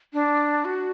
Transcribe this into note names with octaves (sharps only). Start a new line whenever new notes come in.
D4
F#4